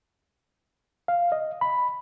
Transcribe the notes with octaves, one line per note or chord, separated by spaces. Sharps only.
F5
D#5
B5